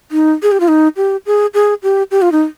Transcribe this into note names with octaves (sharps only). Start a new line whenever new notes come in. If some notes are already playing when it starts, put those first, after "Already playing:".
D#4
G#4
G4
F4
D#4
G4
G#4
G#4
G4
G4
F4
D#4